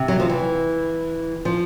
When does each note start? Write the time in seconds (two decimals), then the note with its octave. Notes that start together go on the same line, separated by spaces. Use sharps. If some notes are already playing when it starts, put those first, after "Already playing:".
Already playing: C3
0.08 F#3
0.20 F3
0.29 E3
1.45 F3